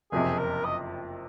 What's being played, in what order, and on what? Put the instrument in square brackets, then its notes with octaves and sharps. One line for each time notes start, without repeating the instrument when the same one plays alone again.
[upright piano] F#1 F2 C3 [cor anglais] G#4
[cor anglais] A#4
D#5